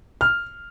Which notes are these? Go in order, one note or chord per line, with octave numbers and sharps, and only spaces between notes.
F6